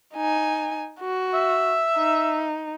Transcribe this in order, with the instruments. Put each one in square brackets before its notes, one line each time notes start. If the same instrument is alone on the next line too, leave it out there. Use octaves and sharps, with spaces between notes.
[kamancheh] D#4 G#5
F#4
[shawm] E5
[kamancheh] D#4